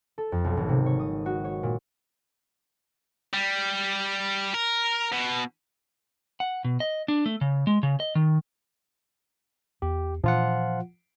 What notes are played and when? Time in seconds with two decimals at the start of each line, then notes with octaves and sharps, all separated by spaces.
0.18 A4
0.32 F2
0.44 B1
0.57 G#1
0.69 C3
0.86 C#5
0.99 D#6
1.26 F#4
1.44 C#5
1.63 A#2
3.33 G3
4.54 A#4
5.12 B2
6.40 F#5
6.65 B2
6.80 D#5
7.08 D4
7.26 A3
7.41 C#3
7.67 G#3
7.83 C#3
8.00 D#5
8.15 D#3
9.82 E2 G4
10.24 A#2 E3 F3 D4 F4 F#5